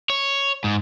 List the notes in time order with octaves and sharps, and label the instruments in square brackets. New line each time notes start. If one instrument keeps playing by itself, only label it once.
[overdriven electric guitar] C#5
G#2